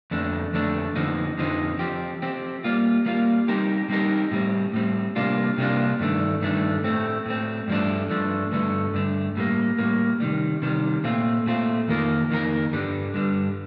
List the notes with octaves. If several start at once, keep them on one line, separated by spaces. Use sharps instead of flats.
F2 D3 A3 D4
F2 D3 A3 D4
F2 D3 F3 C4 D#4
F2 D3 F3 C4 D#4
F3 C4 G4
F3 C4 G4
G3 A#3 F4
G3 A#3 F4
G3 C4 D#4 G4 A#4
G3 C4 D#4 G4 A#4
A2 G3 C4
A2 G3 C4
C3 G3 A#3 D4 F4
C3 G3 A#3 D4 F4
G2 D#3 A3 D4
G2 D#3 A3 D4
A2 A3 C4
A2 A3 C4
G2 F3 A3 D4
G2 F3 A3 D4
G2 D3 A3
G2 D3 A3
A2 G3 A#3
A2 G3 A#3
C3 D#3 G3
C3 D#3 G3
A#2 A3 C4 F4
A#2 A3 C4 F4
F2 D#3 A#3 F4 A#4
F2 D#3 A#3 F4 A#4
G2 D3 G3
G2 D3 G3